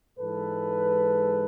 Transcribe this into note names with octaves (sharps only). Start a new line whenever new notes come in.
G#2 E3 G#3 A4 B4